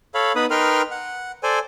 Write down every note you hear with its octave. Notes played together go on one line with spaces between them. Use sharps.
A4 C#5 F5 B5
B3 D#4 B4 B5 D#6
D#4 A#4 B4 G5 C6 F6
F#5
A4 C5 D5 G#5